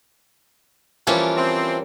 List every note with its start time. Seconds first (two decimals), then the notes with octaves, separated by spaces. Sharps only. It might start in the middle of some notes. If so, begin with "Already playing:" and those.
1.07 E3 F3 G3 A#3 C#4
1.36 C4